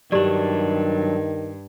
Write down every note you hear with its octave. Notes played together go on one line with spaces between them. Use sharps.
G2 D#3 F#3 D4 G4 D5